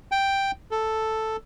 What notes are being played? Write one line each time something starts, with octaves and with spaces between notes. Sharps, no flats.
G5
A4